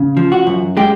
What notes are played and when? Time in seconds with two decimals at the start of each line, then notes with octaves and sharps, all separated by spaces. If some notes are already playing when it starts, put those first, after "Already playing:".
Already playing: C#3
0.17 F3
0.32 F#4
0.47 F#2
0.77 G#3 G4